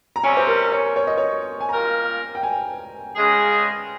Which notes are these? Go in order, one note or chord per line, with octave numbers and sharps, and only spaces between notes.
A#5
C3 G3 C#4 G#5
C5
A#4
C#5
C#5
D#5
C#5
G#5
G3 A#3 F4 A#4 A#5
G5
G#5
C#3 G#3 C#4 G#4